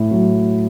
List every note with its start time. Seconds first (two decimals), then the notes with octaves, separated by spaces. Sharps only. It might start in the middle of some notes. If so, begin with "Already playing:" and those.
Already playing: A2
0.11 F#3